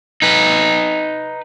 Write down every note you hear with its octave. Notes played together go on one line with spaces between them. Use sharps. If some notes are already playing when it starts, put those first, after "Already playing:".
D#4 B4